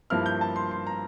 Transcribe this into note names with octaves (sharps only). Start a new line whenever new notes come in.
G2 F3 A#3 E4 F6
G6
A5
C6
C6
A#5